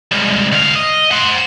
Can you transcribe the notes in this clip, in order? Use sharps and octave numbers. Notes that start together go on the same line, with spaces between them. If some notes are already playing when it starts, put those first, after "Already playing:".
C2 G#2
D2 F5
D#5
C5 F#5